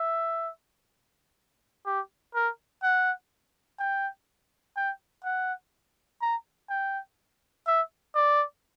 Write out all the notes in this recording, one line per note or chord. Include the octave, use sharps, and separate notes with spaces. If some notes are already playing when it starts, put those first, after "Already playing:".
Already playing: E5
G4
A#4
F#5
G5
G5
F#5
A#5
G5
E5
D5